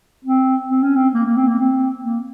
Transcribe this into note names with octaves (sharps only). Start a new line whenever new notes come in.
C4
C4
C#4
C4
A#3
A#3
C4
A#3
C4
A#3